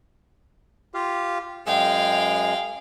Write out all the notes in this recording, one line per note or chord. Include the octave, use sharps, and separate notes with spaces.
F4 G4 F5
F#2 G#3 G#4 F5 G5